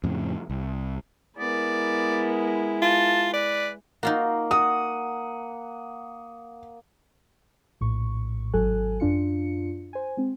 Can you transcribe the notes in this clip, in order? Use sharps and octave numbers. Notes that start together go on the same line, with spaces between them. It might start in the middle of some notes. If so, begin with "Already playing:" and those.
F2 A2 C#3
C2
G#3 B3 E4 A#4 D5
F4 A5
B4 D5
A#3 D#4 F4 F#4
F#4 F#5 D#6
A#1 A2 C#6
G#1 F#3 A4 G#5 F#6
F#2 D4 F4 C#7
C5 G#5
G#3 C4